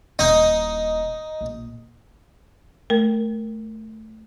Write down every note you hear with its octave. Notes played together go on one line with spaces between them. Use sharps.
D#1 D#4 E4
A#1
A3 A#4